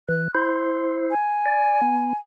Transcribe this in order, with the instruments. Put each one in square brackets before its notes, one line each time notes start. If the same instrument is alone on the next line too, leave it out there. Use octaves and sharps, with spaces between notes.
[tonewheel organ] E3 [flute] F#6
[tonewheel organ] E4 C5 [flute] C6
[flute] G#5
[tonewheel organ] D5
B3